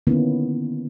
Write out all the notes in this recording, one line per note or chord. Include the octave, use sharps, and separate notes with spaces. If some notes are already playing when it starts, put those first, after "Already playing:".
D3 D#3 A#3 B3 C#4 E4